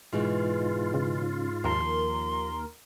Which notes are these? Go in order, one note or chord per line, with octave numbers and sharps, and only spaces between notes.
G#2 B2 E3 G#3 F4
C#3
D#2 F3 A#4 C6